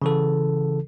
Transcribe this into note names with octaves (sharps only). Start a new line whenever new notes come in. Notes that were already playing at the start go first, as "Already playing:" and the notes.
C#3 E3 A4